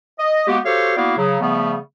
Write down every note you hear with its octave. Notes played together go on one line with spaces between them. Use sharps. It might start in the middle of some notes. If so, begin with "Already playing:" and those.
D#5
G#3 A#3 B3 F#4 G4
F#4 G4 A4 C5 C#5 F5
A#3 B3 E4 F#4 D5 F5
C#3 F#3
C#3 F3 G3 A3 B3